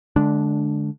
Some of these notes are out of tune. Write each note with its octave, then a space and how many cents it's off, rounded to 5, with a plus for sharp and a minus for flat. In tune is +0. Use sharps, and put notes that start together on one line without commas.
D3 +0 G#3 +25 D4 -10